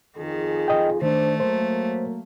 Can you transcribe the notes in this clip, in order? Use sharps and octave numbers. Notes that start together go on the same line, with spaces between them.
F2 D#3 F4 G#4
D#5 G5
D#3 A3 D4 C5
F#3 A#3 C5